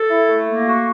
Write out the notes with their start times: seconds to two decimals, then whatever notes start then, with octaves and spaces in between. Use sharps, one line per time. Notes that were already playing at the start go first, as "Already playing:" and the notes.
Already playing: A4
0.10 E4
0.29 A3
0.47 A#3
0.68 F#4